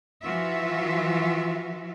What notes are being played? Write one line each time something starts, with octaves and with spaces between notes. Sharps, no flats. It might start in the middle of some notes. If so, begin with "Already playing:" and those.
E3 F3 F4 F#4 E5